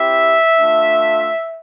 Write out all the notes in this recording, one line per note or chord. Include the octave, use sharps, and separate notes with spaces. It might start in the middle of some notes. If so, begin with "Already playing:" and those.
Already playing: C4 E4 G4 E5
A3 D4 F4